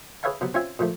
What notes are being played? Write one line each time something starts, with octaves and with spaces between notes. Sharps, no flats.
G#4 B4 C#5 E5 F5 A5
C3 F#3 B3
C4 C#4 F4 E5 G#5
A#2 F3 A3